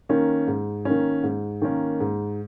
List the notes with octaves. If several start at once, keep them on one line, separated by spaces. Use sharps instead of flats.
D#3 A#3 C#4
G#2
D#3 A#3 C#4
G#2
D#3 A#3 C#4
G#2